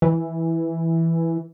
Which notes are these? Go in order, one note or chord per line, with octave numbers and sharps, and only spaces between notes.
E3